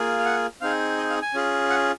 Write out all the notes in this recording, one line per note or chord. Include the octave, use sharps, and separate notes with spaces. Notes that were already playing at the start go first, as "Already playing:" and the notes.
Already playing: A#3 F4 G#4
F5
F#5
C4 D#4 G#4 F5
D#5
F5
G#5
C#4 F4 G#4
F#5